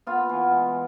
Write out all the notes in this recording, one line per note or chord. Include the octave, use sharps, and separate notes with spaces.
B3 F4
E3
G#3